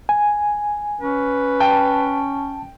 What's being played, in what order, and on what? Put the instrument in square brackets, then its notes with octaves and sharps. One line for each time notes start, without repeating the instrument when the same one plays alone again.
[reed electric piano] G#5
[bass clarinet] C#4 [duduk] B4
[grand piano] G5 [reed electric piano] A5